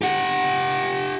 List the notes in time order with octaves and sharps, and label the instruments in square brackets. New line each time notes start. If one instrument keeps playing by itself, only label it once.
[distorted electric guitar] G4 F#5